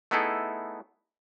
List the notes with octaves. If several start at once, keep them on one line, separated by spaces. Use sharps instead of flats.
A3 B3 D#4 E4 G#4 A4